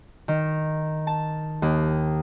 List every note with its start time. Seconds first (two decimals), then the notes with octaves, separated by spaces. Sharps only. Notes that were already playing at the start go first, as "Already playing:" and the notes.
0.28 D#3
1.07 A5
1.62 D#2